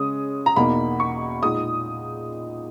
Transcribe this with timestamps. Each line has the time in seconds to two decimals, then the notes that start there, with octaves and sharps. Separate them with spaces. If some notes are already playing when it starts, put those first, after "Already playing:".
Already playing: C#3 G#3 C#4 D#6
0.46 A#5
0.56 E2 B2 A#3 D#4 B5
1.00 C#6
1.42 A#2 G#3 D#4 D#6